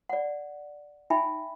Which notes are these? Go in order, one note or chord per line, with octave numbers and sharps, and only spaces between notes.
D5 F#5
D#4 E5 G5 G#5 B5